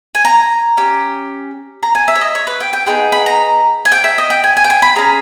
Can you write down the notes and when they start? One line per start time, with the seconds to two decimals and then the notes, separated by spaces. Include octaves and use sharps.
0.15 G#5
0.25 A#5
0.77 C#4 G4
1.83 A#5
1.95 G#5
2.08 E5
2.15 C#5
2.21 D#5
2.35 C#5
2.47 B4
2.60 G5
2.73 G5
2.87 B3 D#4 G#4 G5
3.12 B5
3.26 A#5
3.85 G#5
3.92 G5
4.04 E5
4.18 D#5
4.30 G5
4.44 G#5
4.57 G#5
4.64 G5
4.70 G#5
4.82 B5
4.96 C#4 G#4 A#5